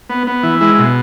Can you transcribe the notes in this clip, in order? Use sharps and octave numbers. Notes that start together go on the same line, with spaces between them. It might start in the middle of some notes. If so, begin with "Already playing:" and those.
B3
B3
E3
G#3 E4
B2